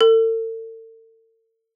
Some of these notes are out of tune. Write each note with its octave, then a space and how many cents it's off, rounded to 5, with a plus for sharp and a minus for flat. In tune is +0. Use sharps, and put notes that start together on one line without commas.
A4 +40